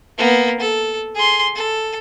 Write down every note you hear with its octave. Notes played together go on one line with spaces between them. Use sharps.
A#3 B3
A4
G#4 C6
A4